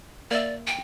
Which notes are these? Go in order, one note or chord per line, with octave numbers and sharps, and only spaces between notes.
A#3 D5 E5
G5